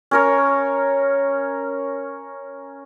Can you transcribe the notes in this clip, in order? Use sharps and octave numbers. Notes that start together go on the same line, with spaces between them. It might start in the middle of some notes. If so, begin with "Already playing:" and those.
C#4 A#4 C#5